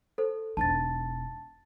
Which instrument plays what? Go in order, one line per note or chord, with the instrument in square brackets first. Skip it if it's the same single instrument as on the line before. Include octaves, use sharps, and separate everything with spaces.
[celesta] A4 C5
[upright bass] E1 D#4 [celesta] A5 A6